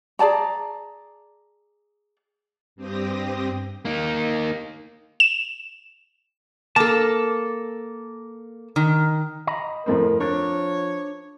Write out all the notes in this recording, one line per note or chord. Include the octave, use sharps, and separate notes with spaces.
G#4 D5 A5 A#5
G2 C4 G4 D#6 A#6
A#3 D#4
E7
A#3 A4 A5
D#3
D#5 A#5 B5
F2 A2 C4 A#4
F3 D4 A#4 C#5